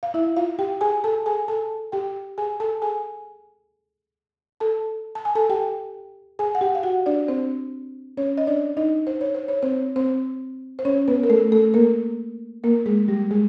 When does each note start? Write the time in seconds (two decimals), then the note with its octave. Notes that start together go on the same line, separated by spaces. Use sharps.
0.03 F5
0.14 E4 E5
0.37 F4 F5
0.59 G4 G5
0.81 G#4 G#5
1.04 A4 A5
1.26 G#4 G#5
1.48 A4 A5
1.92 G4 G5
2.38 G#4 G#5
2.60 A4 A5
2.82 G#4 G#5
4.60 A4 A5
5.15 A5
5.25 G#5
5.35 A4 A5
5.50 G4 G5
6.39 G#4 G#5
6.55 F#5
6.61 G4 G5
6.75 F5
6.83 F#4 F#5
7.06 D4 D5
7.28 C4 C5
8.17 C#4 C#5
8.38 D#5
8.47 D4 D5
8.77 D#4 D#5
9.07 C5
9.21 C#5
9.35 C5
9.48 C#5
9.63 C4 C5
9.96 C4 C5
10.79 C5
10.85 C#4 C#5
11.08 B3 B4
11.23 A#4
11.30 A3 A4
11.52 A3 A4
11.74 A#3 A#4
12.64 A#3 A#4
12.86 G#3 G#4
13.08 G3 G4
13.31 G#3 G#4